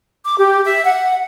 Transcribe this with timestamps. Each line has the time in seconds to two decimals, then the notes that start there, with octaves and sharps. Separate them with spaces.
0.25 D6
0.39 G4
0.65 E5
0.84 F#5